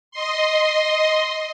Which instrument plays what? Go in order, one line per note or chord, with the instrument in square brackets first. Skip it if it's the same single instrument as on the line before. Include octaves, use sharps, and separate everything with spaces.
[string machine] D#5 C6